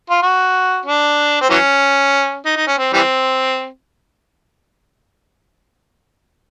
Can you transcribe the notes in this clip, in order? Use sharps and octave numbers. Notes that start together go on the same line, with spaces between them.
F4
F#4
D4
C4
E3 F#3 C#4
D#4
D#4
C#4
C4
E3 G3 C4